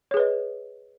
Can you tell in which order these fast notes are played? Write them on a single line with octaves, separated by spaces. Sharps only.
C#5 G#4 B4 D#5